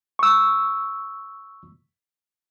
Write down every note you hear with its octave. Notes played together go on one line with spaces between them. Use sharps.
C#6 E6